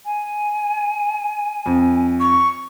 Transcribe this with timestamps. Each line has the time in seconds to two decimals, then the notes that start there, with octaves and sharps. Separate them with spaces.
0.05 G#5
1.66 F2
2.20 C#6